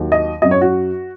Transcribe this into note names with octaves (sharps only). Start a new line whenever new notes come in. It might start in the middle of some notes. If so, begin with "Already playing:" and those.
Already playing: D#2 D#3 F#3
D#5
F#2 F#3 D#5
C#5
F#4